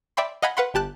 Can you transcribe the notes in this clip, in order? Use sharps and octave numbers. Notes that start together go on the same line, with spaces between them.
D5 E5 G5 B5 C6
D#5 F5 F#5 G#5 B5
B4 F5 F#5 B5 C6
G1 G4 A5 F#6